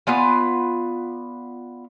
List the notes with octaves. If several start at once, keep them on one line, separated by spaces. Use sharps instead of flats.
B3 F4 D5 G#5